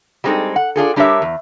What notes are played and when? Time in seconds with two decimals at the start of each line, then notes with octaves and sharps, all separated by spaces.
0.24 G3 G#3 C4 D#4 A4
0.56 F#5
0.76 D4 F4 G#4 A4
0.96 G3 D4 G4 A#4 C#5 E5
1.22 E2